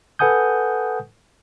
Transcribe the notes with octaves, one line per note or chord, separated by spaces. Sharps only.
A4 B4 F#5 G#5 D#6 G6